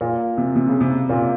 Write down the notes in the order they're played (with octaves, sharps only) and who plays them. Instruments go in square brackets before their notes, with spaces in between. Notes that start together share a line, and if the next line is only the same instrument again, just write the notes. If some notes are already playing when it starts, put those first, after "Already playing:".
[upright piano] A#2
C3
C3
C#3
C3
A#2